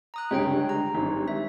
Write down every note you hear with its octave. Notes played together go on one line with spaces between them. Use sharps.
A#5 D#6 F#6
C#2 G2 D3 C#4 C#5 G5
A#5
G#1 G2
E5